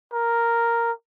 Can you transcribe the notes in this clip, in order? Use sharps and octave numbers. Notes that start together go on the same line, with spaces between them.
A#4